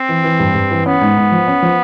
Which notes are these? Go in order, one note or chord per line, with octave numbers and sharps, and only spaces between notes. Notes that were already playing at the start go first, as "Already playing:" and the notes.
Already playing: C4
E3
E3
G2
G2
E3
B3 C#4
G#2
G#2
F3
C#4
F3